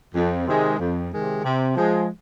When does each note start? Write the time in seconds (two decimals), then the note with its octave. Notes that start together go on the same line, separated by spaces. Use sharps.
0.15 F2
0.47 C3 D#3 G#3
0.79 F2
1.11 C3 D#3 G#3
1.44 C3
1.76 F3 G#3